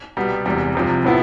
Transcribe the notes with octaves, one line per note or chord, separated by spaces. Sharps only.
C2 B2 G3 B3
E1 E2 C3 G3
C2 C3 F3
A2 F3 B3 E4